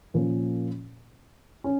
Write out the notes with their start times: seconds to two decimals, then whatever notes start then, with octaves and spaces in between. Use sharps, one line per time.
0.14 A#2 F3 A#3 C#4
1.64 C#4